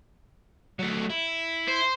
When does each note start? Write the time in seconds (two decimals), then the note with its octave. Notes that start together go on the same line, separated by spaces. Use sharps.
0.79 F#3 A3
1.10 E4
1.68 C5